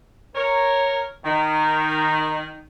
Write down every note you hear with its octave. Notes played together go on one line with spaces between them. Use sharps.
A#4 C#5
D#3